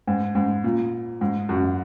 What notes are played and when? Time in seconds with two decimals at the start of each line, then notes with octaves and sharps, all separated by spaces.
0.07 G#2
0.35 G#2
0.64 A#2
1.21 G#2
1.49 F#2